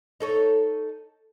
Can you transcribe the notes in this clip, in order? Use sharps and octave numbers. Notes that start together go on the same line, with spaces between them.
D#4 A4 C#5